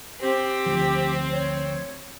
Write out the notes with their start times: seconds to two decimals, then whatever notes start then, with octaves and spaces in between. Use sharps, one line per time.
0.20 C4 G4
0.66 D2 F3
1.31 C#5